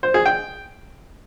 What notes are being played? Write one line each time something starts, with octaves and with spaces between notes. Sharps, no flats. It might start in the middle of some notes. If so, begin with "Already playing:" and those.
C5
G#4
G5